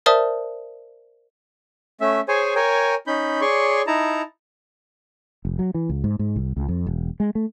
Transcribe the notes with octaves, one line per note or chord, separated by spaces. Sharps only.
A#4 C5 D5 E5 A5 D#6
A3 C#4 E5
G#4 C5 C#5 G#5
A#4 C#5 G5 G#5
C#4 D#4 B5 G6
G#4 C#5 D5 C6 C#6
D#4 E4 A5 A#5
F1
F#3
E3
C#2
G#2
G#2
C2
C#2
F2
E1
G#3
A3